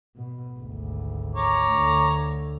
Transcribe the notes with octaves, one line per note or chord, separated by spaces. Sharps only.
B2
G#1 D2
C#5 A#5 D6
D2 D3